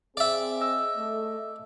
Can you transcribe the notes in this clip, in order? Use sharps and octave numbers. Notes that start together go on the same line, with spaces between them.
C4 G#4 D5 E5
D#5 E6
A3